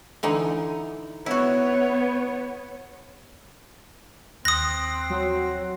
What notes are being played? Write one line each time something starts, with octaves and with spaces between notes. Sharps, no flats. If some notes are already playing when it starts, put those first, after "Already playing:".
D3 E3 D#4
B3 E4 F#4 C#5
D#2 C4 D#6 F#6 A#6
F#3